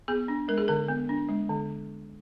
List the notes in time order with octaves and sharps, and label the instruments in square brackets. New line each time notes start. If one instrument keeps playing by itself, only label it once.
[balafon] B3 G#4
D4
G#3 A#4
G#4
D3 A#4
B3
D4
G#3
D3